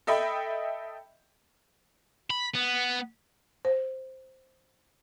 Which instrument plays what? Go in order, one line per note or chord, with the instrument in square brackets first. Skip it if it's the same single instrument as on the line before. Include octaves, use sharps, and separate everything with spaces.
[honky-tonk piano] A4 D#5 E5 G5 B5
[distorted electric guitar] B5
B3
[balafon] C5